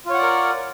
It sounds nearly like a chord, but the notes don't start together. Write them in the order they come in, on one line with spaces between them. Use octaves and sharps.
F4 C#5 F#5 D5 A#4